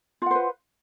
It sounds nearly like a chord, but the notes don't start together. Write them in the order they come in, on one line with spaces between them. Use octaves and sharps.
F4 F#5 C5 B4